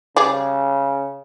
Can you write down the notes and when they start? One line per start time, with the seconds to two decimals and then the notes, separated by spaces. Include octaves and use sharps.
0.16 C#3 G3 G#4 D5